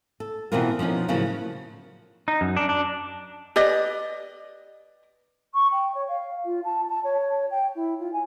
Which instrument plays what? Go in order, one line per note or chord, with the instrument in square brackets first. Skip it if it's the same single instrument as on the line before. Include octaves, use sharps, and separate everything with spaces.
[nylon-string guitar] A4
B2 E3 B3 C4 F4 A#4
F3 B3 C#4 D#4
A2 C#3 F3 F#3 A#3
[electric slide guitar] D#4
F#2
D4
D4
[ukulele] G4 B4 D5 D#5
[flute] C#6
G5
C#5
F5
F4
A5
A5
C#5
G5
E4
F4
G#5